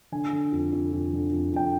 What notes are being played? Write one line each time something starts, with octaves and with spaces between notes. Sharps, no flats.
D3 G#5
D3
F2
F2
F2
D3
F2
F2 G5